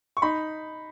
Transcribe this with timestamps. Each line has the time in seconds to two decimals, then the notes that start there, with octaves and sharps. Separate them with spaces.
0.17 C#6
0.22 D#4 B5